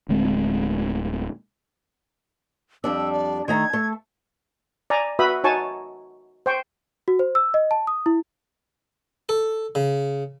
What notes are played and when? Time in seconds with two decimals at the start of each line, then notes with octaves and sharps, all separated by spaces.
0.09 D1 D2 G#3 C4
2.84 F2 G3 D4 E6
3.13 D5
3.48 D#3 A3 A#5 G#6
3.73 A3 A4
4.90 D5 G#5 A#5
5.19 F#4 B4 E5 B5 D#6
5.44 D#4 F#4 C#5 G#5 A5 C#6
6.46 C5 G5 C#6
7.08 F#4
7.19 C5
7.35 E6
7.54 D#5
7.71 A5
7.87 D#6
8.06 E4
9.29 A4
9.75 C#3